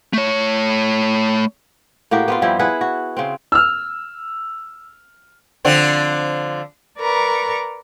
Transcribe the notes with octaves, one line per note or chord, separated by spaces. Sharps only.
A3 C#5
A2 A#3 F#4 G4
B3 C4 F4
G2 F3 G3 E4
E4 G#4 B4 F#5
F#4
C#3 C4
E6 F6
D3 F3 C4
A#4 B4 D5 A#5 C#6